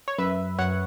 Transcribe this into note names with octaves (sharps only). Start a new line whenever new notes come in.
C#5
F#2 B4 E5
F#2 C#5 F#5